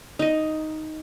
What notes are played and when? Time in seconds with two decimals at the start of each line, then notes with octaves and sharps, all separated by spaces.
0.19 D#4 D#5